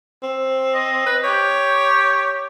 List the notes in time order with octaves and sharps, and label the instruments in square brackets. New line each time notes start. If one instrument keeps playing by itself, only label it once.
[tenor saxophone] C4
[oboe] D#5
[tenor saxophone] B4
[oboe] G4 [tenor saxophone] C#5